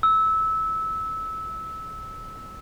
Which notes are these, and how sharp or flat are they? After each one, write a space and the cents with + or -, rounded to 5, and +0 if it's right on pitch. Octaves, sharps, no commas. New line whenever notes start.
E6 -20